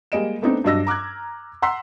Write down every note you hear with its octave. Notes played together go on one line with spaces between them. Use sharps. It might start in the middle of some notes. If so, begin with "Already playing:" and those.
G3 G#3 A#3 D#5 D7 E7
A3 B3 C4 D4 D#4
G2 F#3 D4 D#5 E6 A#6
A#5 D6 F6 F#6 G#6
F#5 A#5 C6 E6 B6